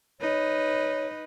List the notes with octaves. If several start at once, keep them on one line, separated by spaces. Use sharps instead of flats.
D#4 B4 C#5